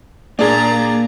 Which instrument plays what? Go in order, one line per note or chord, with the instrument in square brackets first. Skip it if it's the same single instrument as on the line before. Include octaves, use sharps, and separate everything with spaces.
[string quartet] A#2 A#5 A6 [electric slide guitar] A#3 A#4 [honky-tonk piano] D4 G#4